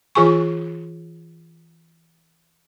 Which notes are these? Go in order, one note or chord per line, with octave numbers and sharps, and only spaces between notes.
E3 F4 G#4 G#5 C#6